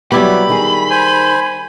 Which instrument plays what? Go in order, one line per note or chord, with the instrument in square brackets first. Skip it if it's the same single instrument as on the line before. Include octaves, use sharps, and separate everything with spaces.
[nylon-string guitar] F#3 B3 [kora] G3 E4 G4 [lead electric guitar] B5
[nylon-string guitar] D#3 G#4
[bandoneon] C5 G#5